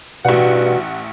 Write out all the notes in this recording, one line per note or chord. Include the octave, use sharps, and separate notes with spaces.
A1 G2 B2 F#4 F#5